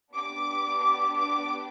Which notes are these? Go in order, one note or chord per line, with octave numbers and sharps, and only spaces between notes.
B3 D4 G4 D6
D6
D6